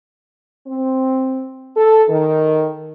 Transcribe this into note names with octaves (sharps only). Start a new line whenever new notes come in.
C4
A4
D#3